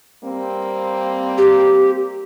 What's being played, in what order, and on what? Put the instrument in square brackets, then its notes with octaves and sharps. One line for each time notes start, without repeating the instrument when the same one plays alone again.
[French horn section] G3 A#3 C4
[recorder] G4